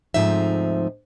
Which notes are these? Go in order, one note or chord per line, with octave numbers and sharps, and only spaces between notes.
D2 G#2 F3 C4 D#4 E5